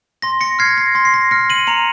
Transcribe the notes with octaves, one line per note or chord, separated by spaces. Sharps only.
C6 A#6
A#6 C#7
F6 G#6 C7
A#6
C6 A#6
C7
A#6
F6 A#6 C#7
D#7 F#7
A#5 C#7 F7